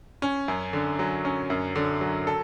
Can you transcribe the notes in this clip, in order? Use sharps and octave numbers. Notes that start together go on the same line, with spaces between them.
C#4
F#2
D3
F#3
C#4
F#2
D3
F#3
A4